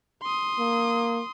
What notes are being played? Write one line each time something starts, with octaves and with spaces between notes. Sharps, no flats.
C6 D#6
A#3